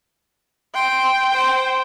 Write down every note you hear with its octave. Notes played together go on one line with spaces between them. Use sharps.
G5 C6
C5